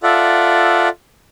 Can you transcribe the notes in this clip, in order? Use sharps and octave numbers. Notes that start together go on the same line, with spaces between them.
F4 A4 D5 E5 F#5